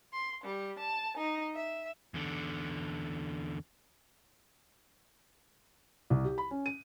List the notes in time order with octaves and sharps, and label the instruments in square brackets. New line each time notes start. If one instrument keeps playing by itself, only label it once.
[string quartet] C6
G3
A5
D#4
E5
[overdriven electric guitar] E2 D3
[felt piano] C2
G4
B5
C#4
D#7